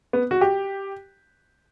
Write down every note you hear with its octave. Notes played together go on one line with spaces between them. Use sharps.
B3
F#4
G4